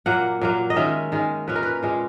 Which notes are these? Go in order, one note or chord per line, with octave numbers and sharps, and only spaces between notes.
A#2 F#3 A#3 F#5
A#2 F#3 A#3
D#5
D#3 G#3 C#4 E5
D#3 G#3 C#4
A#2 G#3 C#4 B4
A#4
B4
A#2 G#3 C#4